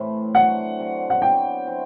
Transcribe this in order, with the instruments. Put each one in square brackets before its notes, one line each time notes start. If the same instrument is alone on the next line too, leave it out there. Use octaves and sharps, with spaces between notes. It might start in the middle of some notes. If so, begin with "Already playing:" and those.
Already playing: [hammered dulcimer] A2 E3 A3 C4 E4
[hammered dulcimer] D3 F#3 C4 [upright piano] F#5
[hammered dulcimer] D3 F#3 C4
[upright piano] F#5
[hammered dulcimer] C3 F#3 B3 D4 [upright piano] G5
[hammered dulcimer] F#3 C4 E4